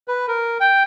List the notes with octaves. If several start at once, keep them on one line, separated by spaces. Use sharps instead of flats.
B4
A#4
G5